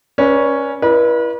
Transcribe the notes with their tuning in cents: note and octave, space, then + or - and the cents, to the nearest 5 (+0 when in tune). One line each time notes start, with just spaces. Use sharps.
C#4 +0 B4 -35 D5 -5
E4 +20 B4 -40 D5 +40